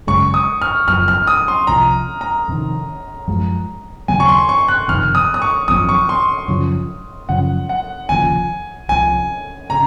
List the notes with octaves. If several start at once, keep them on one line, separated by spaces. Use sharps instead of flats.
G#1 F#2 C#3 G#3 C#6
D#6
F6
F#1 F#2 F3 F6
F6
D#6
C6
C2 C3 F3 A#5
A#5
F2 C3 D#3
F#2 F3 G#3
D#2 C#3 F#3 C4 G#5
C#6
C6
C#6
F#6
F#1 F2 C3 D#3 F6
D#6
D#6
C#6
G#1 F#2 F3 C4 D#6
C#6
C6
F#2 C#3 F3
F#2 C#3 F3 F#5
F#5
F1 D#2 C#3 F3 G#5
C2 C3 F3 G#5
C#3 A#5